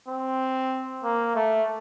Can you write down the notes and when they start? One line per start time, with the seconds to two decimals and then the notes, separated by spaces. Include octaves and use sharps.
0.08 C4
1.04 A#3
1.35 A3